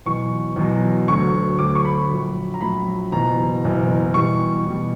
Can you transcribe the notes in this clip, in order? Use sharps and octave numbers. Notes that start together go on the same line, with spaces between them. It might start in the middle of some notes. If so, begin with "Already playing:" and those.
E2 B2 F#3 C#6
E2 B2 F#3
D2 D3 F#3 C#6
D2 D3 F#3 D6
C#6
B5
A#1 A#2 F#3
A#5
A#1 A#2 F#3 B5
F#1 E2 B2 A#5
F#1 E2 B2
E2 B2 G3 C#6
E2 B2 G3